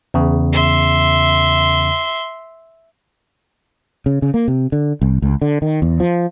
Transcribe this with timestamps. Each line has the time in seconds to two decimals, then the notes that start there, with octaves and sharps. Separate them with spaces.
0.14 E2 C#3
0.53 E5 C6
4.06 C#3
4.22 C#3
4.34 A#3
4.48 C3
4.72 D3
5.02 C2
5.22 C#2
5.42 D3
5.62 D#3
5.82 E2
6.00 F3